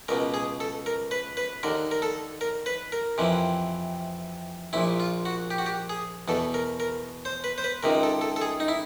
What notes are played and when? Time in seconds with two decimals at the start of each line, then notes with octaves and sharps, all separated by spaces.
0.08 C#2 B2 A#4
0.34 G#4
0.60 A4
0.86 A#4
1.11 B4
1.37 B4
1.63 D#2 D3 A#4
1.91 A#4
2.02 A4
2.41 A#4
2.66 B4
2.92 A#4
3.18 F2 C3 E3
4.73 A#1 A#2 E4
5.00 F4
5.26 F#4
5.51 G4
5.58 F#4
5.66 G4
5.90 G#4
6.28 E2 B2 A4
6.54 A#4
6.80 A#4
7.25 C5
7.44 B4
7.58 C5
7.64 B4
7.83 C#2 C3 D#3 A#4
8.03 A4
8.21 A4
8.36 A4
8.42 G#4
8.60 D#4
8.68 E4